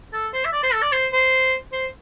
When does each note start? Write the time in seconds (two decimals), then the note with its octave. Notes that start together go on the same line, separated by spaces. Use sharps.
0.13 A4
0.33 C5
0.45 E5
0.52 D5
0.63 C5
0.73 A4
0.82 D5
0.92 C5
1.13 C5
1.72 C5